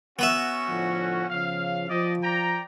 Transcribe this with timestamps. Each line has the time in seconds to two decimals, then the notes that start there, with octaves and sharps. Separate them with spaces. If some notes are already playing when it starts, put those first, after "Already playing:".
0.19 B3 C#4 F#4 B4 E5
0.68 A2 D3 F3
1.30 C#3 F3 F5
1.90 F3 G4 D5 D#5
2.23 D5 G5 A#5